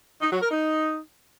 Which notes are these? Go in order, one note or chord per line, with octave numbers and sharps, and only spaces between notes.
D#4
F#3
A#4
D#4